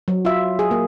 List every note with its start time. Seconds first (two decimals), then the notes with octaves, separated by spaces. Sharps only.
0.08 F#3
0.25 F4 E5
0.59 G#4
0.71 A#3